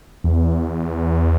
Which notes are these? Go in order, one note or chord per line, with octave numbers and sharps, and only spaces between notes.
E2